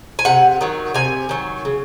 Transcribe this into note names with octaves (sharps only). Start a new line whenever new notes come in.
G#5
C3 F#5
D#3 F#3
C3 G#5
D#3 F#3
C#3